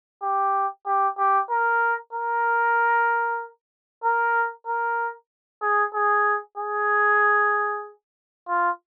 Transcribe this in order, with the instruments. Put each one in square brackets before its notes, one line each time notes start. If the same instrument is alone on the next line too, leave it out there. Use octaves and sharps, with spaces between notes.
[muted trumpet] G4
G4
G4
A#4
A#4
A#4
A#4
G#4
G#4
G#4
F4